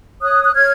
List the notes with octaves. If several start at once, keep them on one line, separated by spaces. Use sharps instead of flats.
C#5 D#6 F#6
F#6
C#5 F6 G#6